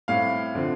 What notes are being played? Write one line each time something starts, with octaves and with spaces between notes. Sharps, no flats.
A2 G3 C4 F5
D3 F3 C4